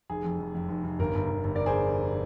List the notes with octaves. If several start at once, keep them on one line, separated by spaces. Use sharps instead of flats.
F1 G#4
F2
F1
F2
F1
F1
G1 A#4
G1
G1
G1
A#4 D5
G#4 C5